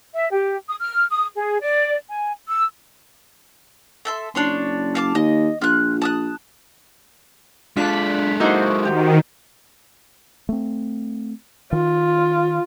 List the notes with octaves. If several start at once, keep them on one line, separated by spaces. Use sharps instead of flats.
E5
G4
D#6
F6
D#6
G#4
D5
G#5
E6
A4 E5 C6
F#1 D4 C#5 C6
F5 A5 D6
D#2 D#5
A#1 F4 F#6
A5 D#6 F#6
G#3 D4 F4 A4 F#6 B6
A#3 D#4 E4 F#4 C5
D#3 G4
A3 C4
D#3 F4